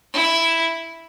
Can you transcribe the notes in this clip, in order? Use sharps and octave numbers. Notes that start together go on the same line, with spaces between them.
E4